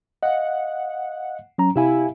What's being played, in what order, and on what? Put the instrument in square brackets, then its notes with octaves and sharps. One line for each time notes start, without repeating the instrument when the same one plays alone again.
[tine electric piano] D#5 F5 [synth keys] F#5
[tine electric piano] F#3 C#4 A#5
[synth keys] C3 E4 [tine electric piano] G4 F5 G#5